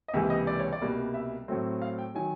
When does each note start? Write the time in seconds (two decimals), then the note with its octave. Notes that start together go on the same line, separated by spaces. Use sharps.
0.08 D#5
0.13 C#2 C3 E3 G3 A#3 E5
0.30 D#5
0.47 D5
0.59 C#5
0.73 D5
0.81 C2 B2 G3 A#3
1.14 E5
1.48 A2 F#3 A3 C4
1.82 F5
1.98 G5
2.15 D#3 F#3 G#5